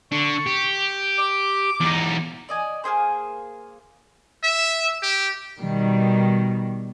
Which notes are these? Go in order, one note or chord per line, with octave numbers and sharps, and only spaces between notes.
D3 D4 C#6
G4
D6
E2 D#4
D5 D#5 G#5
A#3 B3 G#4 C5
E5
G4
B2 D#3 G3